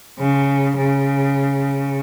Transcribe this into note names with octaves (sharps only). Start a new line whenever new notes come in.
C#3
C#3